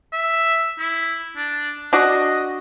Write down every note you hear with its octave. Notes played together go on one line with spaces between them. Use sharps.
E5
E4
D4
D4 F#4 D#5